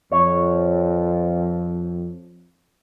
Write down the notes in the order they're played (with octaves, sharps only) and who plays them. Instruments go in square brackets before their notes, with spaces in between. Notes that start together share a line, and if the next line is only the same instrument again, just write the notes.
[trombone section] F2 [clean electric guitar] C#5